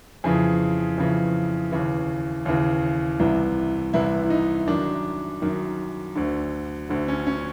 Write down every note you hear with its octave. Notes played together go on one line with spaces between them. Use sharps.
F2 C#3 E3 G#4
F2 C#3 E3
D#2 C#3 E3
D#2 C#3 E3
C2 C3 E3
C2 C3 E3 E4
E4
D#4
F#2 D#3 D4
F#2 D#3
D2 D3
D2 D3
C#4
C#4